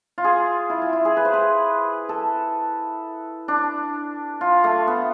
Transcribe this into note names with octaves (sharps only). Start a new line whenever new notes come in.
F4
G#4
E4
F4
E4
G#4
B4
C5
B4
A4
D4
F4
A3
B3